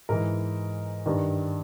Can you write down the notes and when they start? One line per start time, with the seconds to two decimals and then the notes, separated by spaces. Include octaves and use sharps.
0.09 G#2 E3 A#4
1.06 G2 D#3